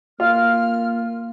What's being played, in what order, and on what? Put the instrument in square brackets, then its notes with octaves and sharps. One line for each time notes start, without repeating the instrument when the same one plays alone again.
[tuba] A#3 [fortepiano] F4 [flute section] F6